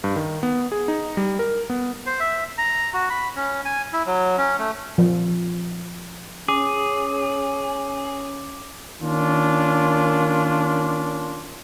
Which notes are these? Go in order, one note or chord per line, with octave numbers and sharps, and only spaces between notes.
G2
D#3
B3
G#4
D#4
G3
A#4
B3
C5
E5
A#5
F#4
B5
C#4
G#5
E4
F#3
C#4
A3
F3
C#4 G#4 D6
D#3 A#3 C#4 D4 F4